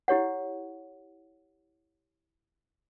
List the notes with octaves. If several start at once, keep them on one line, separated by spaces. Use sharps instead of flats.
E4 G4 C#5 F#5